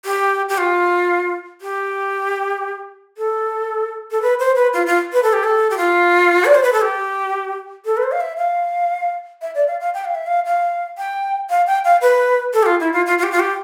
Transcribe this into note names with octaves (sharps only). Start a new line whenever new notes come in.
G4
G4
F4
G4
A4
A4
B4
C5
B4
F4
F4
B4
A4
G4
A4
G4
F4
D5
C5
B4
A4
G4
A4
B4
C5
F5
E5
F5
E5
D5
F5
F5
G5
F5
E5
F5
F5
G5
F5
G5
F5
B4
A4
G4
F4
E4
F4
F4
F4
G4
F4
G4